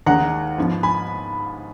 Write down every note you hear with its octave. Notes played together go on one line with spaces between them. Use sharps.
D#2 D#3 G#3 F#5 A#5
G#2 F3 B3
G#5 B5